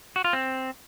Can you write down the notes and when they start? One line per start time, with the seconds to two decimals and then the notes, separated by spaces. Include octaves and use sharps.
0.16 F#4
0.24 F4
0.33 C4